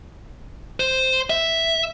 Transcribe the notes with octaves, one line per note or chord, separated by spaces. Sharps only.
C5
E5